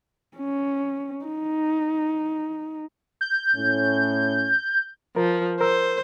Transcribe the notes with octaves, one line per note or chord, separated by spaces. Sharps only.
C#4
D#4
G6
A2 C#4
F3 A#4
A#4 C5 E6